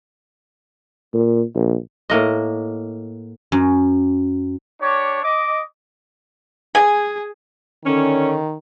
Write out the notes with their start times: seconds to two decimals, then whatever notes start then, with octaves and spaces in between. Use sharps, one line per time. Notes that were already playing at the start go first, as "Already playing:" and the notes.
1.14 A#2
1.55 A#1
2.10 A2 A#3 D#5
3.52 F#2
4.82 D4 G4 C#5
5.23 D#5 D6
6.75 G#4 G#5
7.85 D3 D#3 C#4